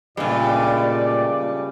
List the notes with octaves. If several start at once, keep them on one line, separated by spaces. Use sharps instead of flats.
G2 A#2 C#3 G#3 A3 D5